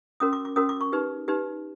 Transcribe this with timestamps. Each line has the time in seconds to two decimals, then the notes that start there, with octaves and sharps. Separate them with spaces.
0.20 C#4 F#4 A#4 D#6
0.33 D6
0.45 D6
0.56 C#4 F#4 A#4 D#6
0.69 D6
0.81 C#6
0.92 D#4 G4 B4
1.28 D#4 G4 B4